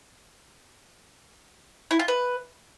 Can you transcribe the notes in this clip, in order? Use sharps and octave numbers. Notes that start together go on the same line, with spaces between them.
E4
F4
B4